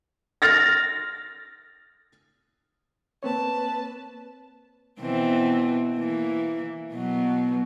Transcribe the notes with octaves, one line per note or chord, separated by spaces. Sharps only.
F6 A6 A#6
A#3 C4 B4 C#5 A5
B2 E3 C4
E3 A#3
B2 F#3